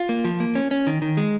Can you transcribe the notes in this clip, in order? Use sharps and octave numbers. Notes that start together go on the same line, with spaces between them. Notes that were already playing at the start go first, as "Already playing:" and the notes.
Already playing: F4
A#3
F3
A#3
C#4
C#4
D#3
D#3
G#3